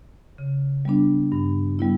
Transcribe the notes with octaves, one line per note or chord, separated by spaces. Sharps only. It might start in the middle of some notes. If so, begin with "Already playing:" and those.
C#3
G3 B3 D4
G2
G3 B3 E4